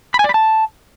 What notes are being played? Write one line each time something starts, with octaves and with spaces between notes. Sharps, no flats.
B5
G#5
D5
B5
A5